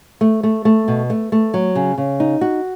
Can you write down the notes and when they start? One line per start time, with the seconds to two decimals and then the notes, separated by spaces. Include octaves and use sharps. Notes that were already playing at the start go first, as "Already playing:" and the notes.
0.21 A3
0.43 A3
0.65 A3
0.88 B2
1.10 A3
1.32 A3
1.54 F#3
1.75 C#3
1.98 C#3
2.20 D#4
2.41 F#4